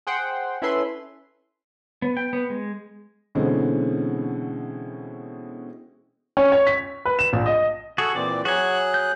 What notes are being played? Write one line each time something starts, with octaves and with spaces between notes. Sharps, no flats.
G#4 C5 F#5 G5 C6
C#4 E4 A4 B4 E5 C6
B3
G5
B3
G#3
B2 D3 E3 G#3 C4 C#4
C#4
C#5
B6
B4
E7
A#1
D#5
F#4 G#4 A4 C#6
A#2 E3 C4 D5
F#3 F#4 G#4 G#5 F#6
G6